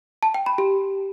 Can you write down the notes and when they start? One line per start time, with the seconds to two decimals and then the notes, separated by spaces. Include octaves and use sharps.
0.23 A5
0.34 G5
0.46 B5
0.58 G4